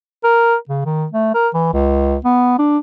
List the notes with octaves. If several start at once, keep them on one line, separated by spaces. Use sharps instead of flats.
A#4
C#3
D#3
A3
A#4
E3
C#2
B3
D4